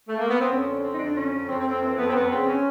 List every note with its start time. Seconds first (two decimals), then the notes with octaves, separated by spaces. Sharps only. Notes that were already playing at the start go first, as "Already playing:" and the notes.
0.09 A3
0.19 A#3
0.29 B3
0.40 C4
0.49 F2 C#4
0.67 D3
0.83 D3 C4
0.94 D#4
0.99 F2 D4
1.15 D3 C#4
1.32 F2
1.48 F2 C4
1.59 C4
1.65 F2
1.71 C4
1.82 E3 C4
1.98 F2 B3
2.09 C4
2.14 F2 B3
2.30 C#3 C4
2.48 C#4